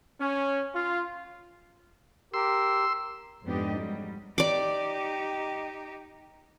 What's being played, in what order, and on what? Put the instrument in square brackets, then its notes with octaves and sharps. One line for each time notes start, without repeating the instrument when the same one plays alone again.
[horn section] C#4
F4
[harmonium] G4 A#4 [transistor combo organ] C6 E6
[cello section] F2 G#2 B3 D4 G4 D#5
G#2 F#3 G3
[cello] D#4 G4 [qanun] D5 D6